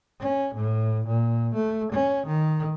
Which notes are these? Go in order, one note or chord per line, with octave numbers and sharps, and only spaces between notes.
C#4
A2
A#2
A3
C#4
D#3